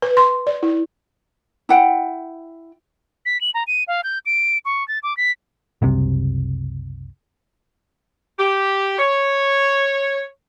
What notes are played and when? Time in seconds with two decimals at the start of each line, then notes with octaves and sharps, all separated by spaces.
0.02 B4
0.17 C6
0.47 D5
0.63 E4
1.69 E4 F#5 G5
3.26 B6
3.41 F#7
3.54 A#5
3.67 D#7
3.88 F5
4.04 G6
4.26 D7
4.65 C#6
4.88 A6
5.03 D6
5.17 B6
5.82 F#1 C2 C3
8.39 G4
8.99 C#5